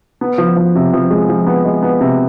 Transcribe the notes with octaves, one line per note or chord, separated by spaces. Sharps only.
B3
F3
F3
C3
F3
G#3
F3
B3
G#3
B3
C3